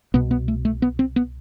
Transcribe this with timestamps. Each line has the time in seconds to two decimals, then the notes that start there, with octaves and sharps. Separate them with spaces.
0.14 C2 B2 B3
0.31 B3
0.48 A3
0.65 A3
0.82 B3
0.99 C4
1.16 B3